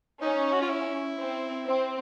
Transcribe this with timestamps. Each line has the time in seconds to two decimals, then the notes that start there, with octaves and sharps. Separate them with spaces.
0.21 C#4 D#4
0.53 F#4
0.62 F4
0.69 E4
1.18 C4
1.66 C4